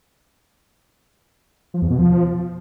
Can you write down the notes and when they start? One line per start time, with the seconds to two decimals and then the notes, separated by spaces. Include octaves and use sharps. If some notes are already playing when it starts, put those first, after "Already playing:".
1.74 F3
1.82 E2
1.90 B2
1.99 F3